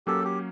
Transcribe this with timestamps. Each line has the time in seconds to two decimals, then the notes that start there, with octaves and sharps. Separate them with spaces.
0.07 F#3 A#3 C#4 G4 A4
0.24 G4